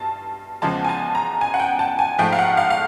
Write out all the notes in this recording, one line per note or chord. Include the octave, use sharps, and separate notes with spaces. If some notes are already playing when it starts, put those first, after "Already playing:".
Already playing: G2 A5
E2 C#3 F3 G#3 A5
G#5
A5
A#5
G#5
F#5
G5
A5
G#5
G#2 F3 A3 G5
F5
F#5
F5
F5